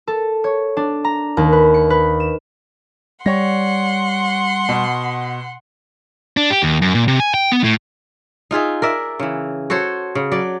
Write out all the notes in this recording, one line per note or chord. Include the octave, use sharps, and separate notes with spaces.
A4
C#5
D4
A#5
D#2
B4
C#7
B4
E7
G3 C#5 F#5 C6 A#6
B2
D4
G4
D#2
F#2
A#2
C3
G#5
G5
B3
A2
D#4 F4 G#4 E5
A#4 D5 E5
C#3 E3
F#4 A4 C5 C#5
C#3
F#3 D5